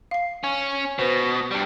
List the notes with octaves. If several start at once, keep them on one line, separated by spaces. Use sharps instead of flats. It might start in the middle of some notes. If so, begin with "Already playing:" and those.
F5 C7
C#4
B2 B4 C5
G2 G3